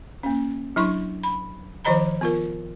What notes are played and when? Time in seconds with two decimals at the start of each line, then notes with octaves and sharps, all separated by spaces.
0.23 A#3 C#4
0.76 F#3 D4 E4 C6 C#6
1.24 B5
1.85 D#3 F3 C5 D#5 A#5 B5
2.21 B3 F4 A#4